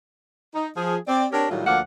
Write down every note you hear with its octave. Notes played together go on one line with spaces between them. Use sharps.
D#4
F3 G#4
C4 D5
C4 D4 G4 A#4 C#5
A2 D#3 F#3 G3 A3 F4
D2 F3 A#3 D5 F5 F#5